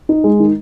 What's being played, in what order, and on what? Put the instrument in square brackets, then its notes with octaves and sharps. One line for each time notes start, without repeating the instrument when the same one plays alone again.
[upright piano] D#4
G#3
D#3